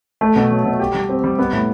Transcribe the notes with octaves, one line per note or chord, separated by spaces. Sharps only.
A3
B2
F#3
B2
G4
G3
C4
G3
B3
A2